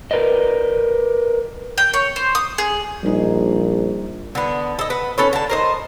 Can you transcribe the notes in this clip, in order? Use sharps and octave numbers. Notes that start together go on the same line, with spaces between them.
A#4 B4 D5 D#5
G5
C#5
C5
D#6
G#4
A#1 G3 D#4
D3 B3
A4 D#5
B4 F#5
C#4 A4 B4 C#5
D3 A5
A#4 C5 D#5